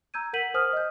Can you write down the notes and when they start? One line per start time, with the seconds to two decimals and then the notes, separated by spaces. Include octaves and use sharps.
0.14 A#5 E6 G6 G#6 D#7
0.33 A#4 F#5 G6 B6 D#7 F#7
0.54 C5 G#5 D#6 F6
0.73 D#5 G6